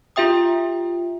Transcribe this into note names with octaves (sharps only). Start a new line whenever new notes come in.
F4 G4 E5 G5 D#6